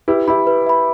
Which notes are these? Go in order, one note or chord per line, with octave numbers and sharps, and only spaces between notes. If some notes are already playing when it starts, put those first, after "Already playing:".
E4 G4 B4
E4 G4 E5 B5
B4
E5 B5